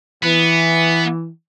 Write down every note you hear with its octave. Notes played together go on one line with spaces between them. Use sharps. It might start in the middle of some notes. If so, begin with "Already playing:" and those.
E3 B3